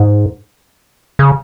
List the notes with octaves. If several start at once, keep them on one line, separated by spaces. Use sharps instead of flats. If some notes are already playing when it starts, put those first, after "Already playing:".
Already playing: G#2
C#3